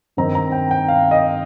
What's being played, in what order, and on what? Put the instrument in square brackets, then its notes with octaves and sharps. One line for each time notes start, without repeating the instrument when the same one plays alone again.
[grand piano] G2 D#3 C4 D#4 A#5
A#5
G5
G5
F5
D#5